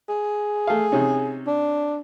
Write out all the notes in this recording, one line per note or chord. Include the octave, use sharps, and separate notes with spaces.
G#4
A3 F5
C3 C#4 D#4
D4